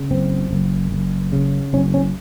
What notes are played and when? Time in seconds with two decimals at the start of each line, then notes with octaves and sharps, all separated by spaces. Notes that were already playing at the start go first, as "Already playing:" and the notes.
Already playing: C#3
0.11 F#1 C4
0.51 F#1
0.92 F#1
1.32 C#3
1.73 F#1 C#4
1.94 C#4